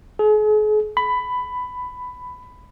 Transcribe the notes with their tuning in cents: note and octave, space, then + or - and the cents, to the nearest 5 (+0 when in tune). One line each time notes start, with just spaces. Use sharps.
G#4 +40
B5 +15